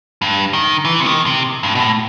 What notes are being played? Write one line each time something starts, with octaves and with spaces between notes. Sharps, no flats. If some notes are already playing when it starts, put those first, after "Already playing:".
G2
D#3
E3
C3
D#3
C3
G2
B2
A2